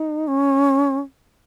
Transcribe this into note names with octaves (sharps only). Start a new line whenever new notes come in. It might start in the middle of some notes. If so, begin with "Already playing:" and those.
Already playing: D#4
C#4